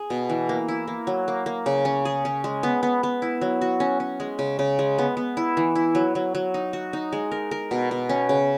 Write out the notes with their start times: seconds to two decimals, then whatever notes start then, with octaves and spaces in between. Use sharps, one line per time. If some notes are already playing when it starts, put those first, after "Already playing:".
Already playing: G#4
0.10 B2
0.29 E3
0.49 A#3
0.68 E4
0.87 A#3
1.07 F#3
1.28 A#3
1.46 A#3
1.66 C#3
1.85 C#4
2.05 G#4
2.25 C#4
2.44 G#3
2.63 B3
2.83 B3
3.03 B3
3.22 E4
3.41 F#3
3.61 F#4
3.80 C#4
4.00 C#4
4.20 G#3
4.39 C#3
4.59 C#3
4.79 G#3
4.98 B3
5.17 B3
5.37 E4
5.57 E3
5.75 E4
5.95 F#3
6.15 F#3
6.35 F#3
6.54 D#4
6.73 F#4
6.93 D#4
7.13 G#3
7.31 A#4
7.51 A#4
7.71 B2
7.91 B2
8.09 C#4
8.29 C#3